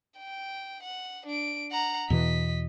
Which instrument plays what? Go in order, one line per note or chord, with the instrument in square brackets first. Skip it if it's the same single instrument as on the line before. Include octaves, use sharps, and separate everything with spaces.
[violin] G5
F#5
D4 D7
F#5 A#5
[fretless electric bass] E2 B2 E3 [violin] D#5 B6